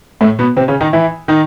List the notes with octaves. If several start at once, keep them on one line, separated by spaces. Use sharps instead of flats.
A2 A3
B2 B3
C3 C4
C#3 C#4
D#3 D#4
E3 E4
D#3 D#4